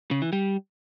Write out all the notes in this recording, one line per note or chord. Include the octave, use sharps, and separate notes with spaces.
C#3
E3
G3